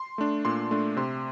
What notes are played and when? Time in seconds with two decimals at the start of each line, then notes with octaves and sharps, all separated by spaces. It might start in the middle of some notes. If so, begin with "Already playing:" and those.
Already playing: C6
0.18 A3 D4
0.45 A#2 C6
0.71 A3 D4
0.97 C3 C6